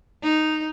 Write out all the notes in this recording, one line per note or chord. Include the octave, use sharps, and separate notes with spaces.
D#4